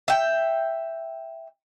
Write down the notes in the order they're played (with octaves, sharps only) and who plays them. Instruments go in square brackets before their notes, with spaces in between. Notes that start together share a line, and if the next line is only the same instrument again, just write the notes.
[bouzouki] E5 G5